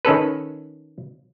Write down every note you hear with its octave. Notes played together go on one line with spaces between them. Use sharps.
D#3 C#4 A4 B4